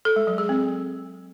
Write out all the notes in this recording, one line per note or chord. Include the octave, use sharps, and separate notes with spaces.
A4
G#3
F#3
G#4
C4